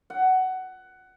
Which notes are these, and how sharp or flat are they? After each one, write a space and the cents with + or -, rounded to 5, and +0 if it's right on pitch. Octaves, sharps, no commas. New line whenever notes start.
F#5 +15